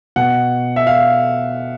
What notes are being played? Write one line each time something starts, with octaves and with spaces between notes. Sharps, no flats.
B2 F#5
E5
F5